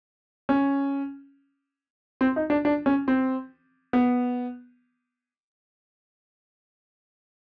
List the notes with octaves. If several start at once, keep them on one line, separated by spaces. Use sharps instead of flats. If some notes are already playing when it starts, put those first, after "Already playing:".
C#4
C4
D#4
D4
D4
C#4
C4
B3